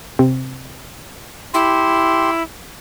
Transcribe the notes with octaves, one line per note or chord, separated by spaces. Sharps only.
C3
E4 G4 C6